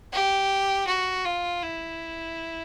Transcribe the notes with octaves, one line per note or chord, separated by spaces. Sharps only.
G4
F#4
F4
E4